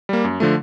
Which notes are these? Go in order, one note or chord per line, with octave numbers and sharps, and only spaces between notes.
G3 A#3
F#2
D3 F3 A3